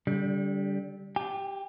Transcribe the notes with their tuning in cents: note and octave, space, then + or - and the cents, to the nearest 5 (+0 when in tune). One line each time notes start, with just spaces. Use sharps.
D3 -30 G3 +0
G4 +0 G#5 -45